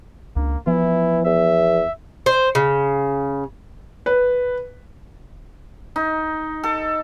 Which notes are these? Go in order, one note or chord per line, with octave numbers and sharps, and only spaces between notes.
C#2 A#3 D4
E3 F3 B3 E4
E2 E5
C5
C#3
B4
D#4
A4